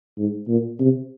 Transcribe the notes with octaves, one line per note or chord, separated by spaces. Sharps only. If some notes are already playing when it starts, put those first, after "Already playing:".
G#2
A#2
C3